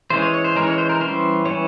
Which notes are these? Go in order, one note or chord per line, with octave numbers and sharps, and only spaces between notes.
E3 G#3 C#4 C5
C#5
C#5
C5
E3 G#3 C#4 A#4
C#5
C5
A#4
E3 G3 C#4 C5
E3 G3 C#4 C#5